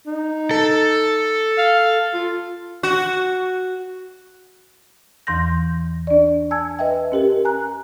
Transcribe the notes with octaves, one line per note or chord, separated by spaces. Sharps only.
D#4
A4
F5
F4
F#4
E2 E3 C6 G6 A#6
D4 D5
G#5 A5 E6 G#6
B4 D#5 E5 G5
C#4 G4 A#4
G#5 A#5 F#6